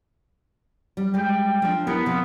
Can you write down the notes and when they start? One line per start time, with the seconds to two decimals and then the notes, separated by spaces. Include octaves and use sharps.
0.97 G3
1.14 G3 G#3 G5
1.62 F3 D4
1.87 B3 E4 G4 A#4
2.06 C3 F3